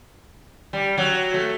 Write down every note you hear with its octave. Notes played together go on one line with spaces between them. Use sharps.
G3
F#3
A3